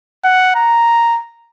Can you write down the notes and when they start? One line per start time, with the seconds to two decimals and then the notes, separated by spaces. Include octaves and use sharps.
0.24 F#5
0.55 A#5